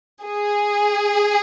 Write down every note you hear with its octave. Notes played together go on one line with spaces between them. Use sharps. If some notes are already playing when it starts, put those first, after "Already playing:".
G#4